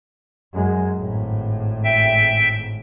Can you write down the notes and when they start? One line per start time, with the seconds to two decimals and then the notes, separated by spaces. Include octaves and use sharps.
0.53 F#2 G#3
0.96 G#1 A2
1.84 E5 G5